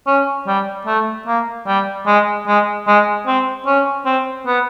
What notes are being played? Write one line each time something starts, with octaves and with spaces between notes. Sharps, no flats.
C#4
G3
A3
A#3
G3
G#3
G#3
G#3
C4
C#4
C4
B3